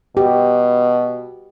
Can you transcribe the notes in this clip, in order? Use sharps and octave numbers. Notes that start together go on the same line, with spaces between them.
B2 G4